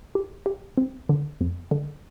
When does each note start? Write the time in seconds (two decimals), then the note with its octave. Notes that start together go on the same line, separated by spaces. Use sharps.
0.15 G4
0.46 G4
0.77 C4
1.09 D3
1.41 F2
1.71 D3